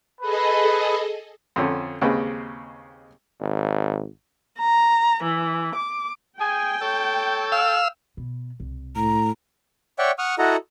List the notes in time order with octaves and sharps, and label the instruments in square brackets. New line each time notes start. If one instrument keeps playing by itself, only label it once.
[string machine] G#4 A4 D#5 [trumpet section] B4
[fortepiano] F2 D3 C#4
D#2 C#3 G#3 C4 B4
[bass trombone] G#1
[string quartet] A#5
E3
D6
[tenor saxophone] G#4 [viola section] G5 [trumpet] G#5
[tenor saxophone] A4 [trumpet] C#5
[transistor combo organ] F5 E6
[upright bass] B2
C2
[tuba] A2 [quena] A#5
[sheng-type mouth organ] C#5 D5 E5 F#5 G5 C#6
F#5 C#6 D#6 F6
E4 F#4 A4 D#5 F#5 A#5